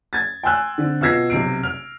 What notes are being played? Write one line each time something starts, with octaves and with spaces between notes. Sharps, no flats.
G#6 A6
G5 G#5 C6 E6 F#6
D3 C4
B2 F4 E6 G#6 A#6 C7
B1 C3 C7 D7
F6